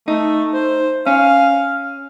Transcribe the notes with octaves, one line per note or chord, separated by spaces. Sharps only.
A3 D#4
C5
C#4 F5